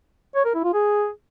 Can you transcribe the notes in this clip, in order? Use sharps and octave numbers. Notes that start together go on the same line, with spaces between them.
C#5
A#4
E4
F4
G#4